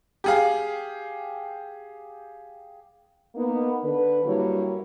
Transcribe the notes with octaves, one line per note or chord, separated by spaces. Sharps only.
G4 G#4 F5
A#3 B3 D#4
D3 B4
G2 F#3 G3 A#3 E4 C#5